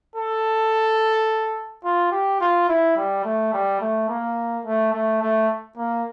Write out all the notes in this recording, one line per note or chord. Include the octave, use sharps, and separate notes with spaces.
A4
F4
G4
F4
E4
G3
A3
G3
A3
A#3
A3
A3
A3
A#3